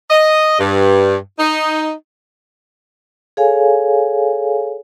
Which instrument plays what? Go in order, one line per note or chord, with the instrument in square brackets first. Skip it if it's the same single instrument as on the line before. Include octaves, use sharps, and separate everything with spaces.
[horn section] D#5
G2
D#4
[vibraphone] G#4 A4 C#5 F5 G#5